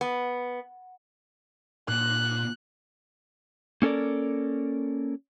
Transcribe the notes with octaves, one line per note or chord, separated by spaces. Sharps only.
B3
A#2 F#6
A#3 C#4 A4 A#4 D5